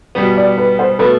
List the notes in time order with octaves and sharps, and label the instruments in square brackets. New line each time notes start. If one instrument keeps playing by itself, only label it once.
[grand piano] B2 G3 B3
[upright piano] D5
B4
C5
[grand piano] B2 A3 [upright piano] B4